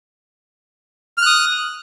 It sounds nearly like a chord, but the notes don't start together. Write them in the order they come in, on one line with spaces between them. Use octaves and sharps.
F6 F#6 D#6